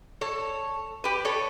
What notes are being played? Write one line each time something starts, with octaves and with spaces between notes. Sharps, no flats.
A4 C#5
G4 B4
A4 C#5